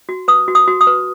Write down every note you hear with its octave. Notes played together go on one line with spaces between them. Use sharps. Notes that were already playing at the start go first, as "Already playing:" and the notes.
F#4
B4 D#6
F#4
D#6
F#4
D#6
B4